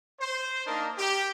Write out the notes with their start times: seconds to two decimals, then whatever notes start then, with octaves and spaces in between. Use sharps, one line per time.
0.19 C5
0.67 A#3 D4 D#4 A#4
0.98 G4